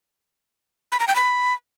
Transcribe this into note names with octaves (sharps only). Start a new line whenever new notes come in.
B5
A#5
G5
B5